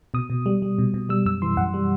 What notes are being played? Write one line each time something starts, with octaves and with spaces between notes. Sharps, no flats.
B2 D#6
B2
G3
G3
B2
B2
G3 E6
F#2 E6
E3 C6
F#2 F#5
G3